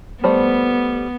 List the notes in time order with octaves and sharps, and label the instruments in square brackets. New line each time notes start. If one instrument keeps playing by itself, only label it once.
[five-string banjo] G3 A3 C5 [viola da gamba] B3